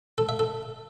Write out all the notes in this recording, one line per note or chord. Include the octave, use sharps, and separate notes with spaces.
A4
E5
A4